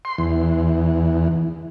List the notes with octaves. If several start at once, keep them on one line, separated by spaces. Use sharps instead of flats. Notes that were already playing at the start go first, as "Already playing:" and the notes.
C6
E2